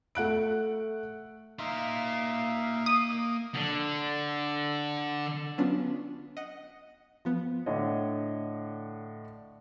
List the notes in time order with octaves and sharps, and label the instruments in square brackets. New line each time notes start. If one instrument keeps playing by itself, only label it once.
[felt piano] A3 F#5 F#6 D7
[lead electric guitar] A#3 C6 [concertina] D#4 E5 F5
[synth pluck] D#6
[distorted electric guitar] D3 D4
[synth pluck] F#3 B3 C#4 D4 F4
D#5 F#5
F3 B3
[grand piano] A2 D3 C#5 D#5